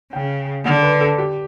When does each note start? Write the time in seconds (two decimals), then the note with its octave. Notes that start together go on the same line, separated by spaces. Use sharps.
0.12 C#3 G5
0.65 D3 F#5
0.83 B4
1.01 A4
1.18 G4